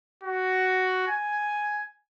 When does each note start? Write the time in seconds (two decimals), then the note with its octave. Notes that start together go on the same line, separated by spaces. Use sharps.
0.23 F#4
1.07 G#5